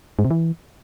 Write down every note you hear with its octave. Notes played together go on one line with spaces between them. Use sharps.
G#2
C3
E3